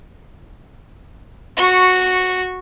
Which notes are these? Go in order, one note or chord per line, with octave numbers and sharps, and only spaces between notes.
F#4 C#6